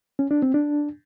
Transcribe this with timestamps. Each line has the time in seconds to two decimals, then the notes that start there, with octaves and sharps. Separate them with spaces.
0.19 C#4
0.31 D4
0.42 C4
0.54 D4